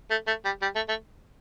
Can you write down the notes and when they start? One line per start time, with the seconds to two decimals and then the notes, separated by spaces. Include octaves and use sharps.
0.10 A3
0.27 A3
0.45 G3
0.62 G3
0.75 A3
0.88 A3